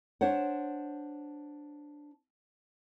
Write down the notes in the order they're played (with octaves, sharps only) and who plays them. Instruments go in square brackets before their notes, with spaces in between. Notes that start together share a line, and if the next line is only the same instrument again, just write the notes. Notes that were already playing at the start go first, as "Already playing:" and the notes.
[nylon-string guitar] D4 C5 C#5 F#5